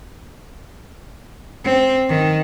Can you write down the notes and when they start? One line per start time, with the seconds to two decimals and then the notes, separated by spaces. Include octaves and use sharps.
1.65 C4
2.09 D#3